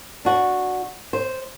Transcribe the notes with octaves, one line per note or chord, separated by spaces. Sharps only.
D4 F#4
C5